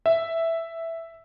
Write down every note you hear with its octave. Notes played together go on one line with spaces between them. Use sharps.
E5